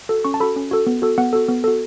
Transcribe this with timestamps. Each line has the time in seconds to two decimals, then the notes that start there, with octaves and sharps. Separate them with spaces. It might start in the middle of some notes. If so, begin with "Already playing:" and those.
0.09 F#4 A4
0.24 C#4 C#6
0.34 A5
0.40 F#4 A4 B5
0.56 C#4
0.71 F#4 A4
0.87 B3
1.02 F#4 A4
1.18 B3 F#5
1.33 F#4 A4
1.48 B3
1.64 F#4 A4